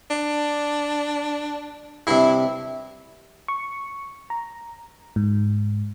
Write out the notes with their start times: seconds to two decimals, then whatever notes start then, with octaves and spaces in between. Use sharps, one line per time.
0.10 D4
2.07 G2 C3 E4
3.48 C#6
4.30 A#5
5.16 G#2